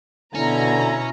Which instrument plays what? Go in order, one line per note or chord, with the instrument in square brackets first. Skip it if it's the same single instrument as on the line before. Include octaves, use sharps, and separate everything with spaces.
[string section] B2 A#5 [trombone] D3 [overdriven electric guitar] C#4 [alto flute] E4